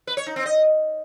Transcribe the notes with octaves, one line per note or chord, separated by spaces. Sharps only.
B4
C#5
D#4
C4
D#5